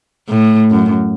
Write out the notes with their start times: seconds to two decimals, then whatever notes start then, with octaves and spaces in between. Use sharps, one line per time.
0.29 A2
0.71 F#2